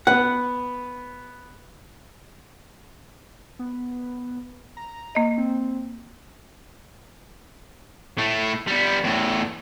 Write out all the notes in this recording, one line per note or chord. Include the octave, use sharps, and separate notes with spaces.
B3 B4 F#5
B3
A#5
A#3 D#5
C4
A2 A3
G3 B3
E2 A2